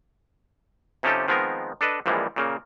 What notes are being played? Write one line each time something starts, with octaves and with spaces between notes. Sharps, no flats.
C3 F3 C#4 D#4 G4 A4
D#3 F3 G#3 B3 C4 A#4
D4 A4 B4 D#5
A#1 A#2 E3 F3 G3 G#3
A#2 C#3 A#3